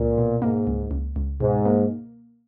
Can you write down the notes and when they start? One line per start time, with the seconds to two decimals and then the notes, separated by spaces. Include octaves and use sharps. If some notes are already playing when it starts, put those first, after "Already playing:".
Already playing: C#2 A#2
0.18 B2
0.42 G#2 A#3
0.67 C#2
0.91 C#2
1.16 C#2
1.41 G#2 B2
1.66 A#3